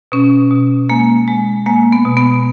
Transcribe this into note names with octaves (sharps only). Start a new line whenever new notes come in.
B2 C#4
B2
G#3 A#3
G#3
G#3 A#3
B3
B2
B3